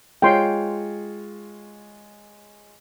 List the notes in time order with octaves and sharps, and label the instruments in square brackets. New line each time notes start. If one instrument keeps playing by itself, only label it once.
[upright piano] G#3 F4 C#5 [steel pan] G5 C6